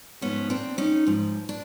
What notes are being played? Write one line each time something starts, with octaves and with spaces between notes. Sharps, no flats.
G#2 F3 B3 C#4
C4 D4
C#4 D#4
G#2 F3
D4